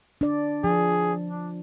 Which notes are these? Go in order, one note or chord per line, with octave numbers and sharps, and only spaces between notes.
D4 D5
F3 G#4
D4